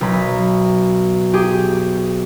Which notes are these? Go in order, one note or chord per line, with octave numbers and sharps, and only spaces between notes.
B1 B5
G4 G#4